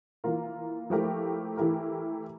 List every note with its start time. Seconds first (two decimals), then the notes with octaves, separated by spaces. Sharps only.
0.24 E3 A#3 F4 A#4
0.90 F3 A3 E4 G4 A#4
1.57 E3 A3 E4 G4 A#4